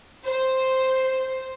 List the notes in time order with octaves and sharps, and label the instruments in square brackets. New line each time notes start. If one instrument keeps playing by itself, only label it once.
[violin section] C5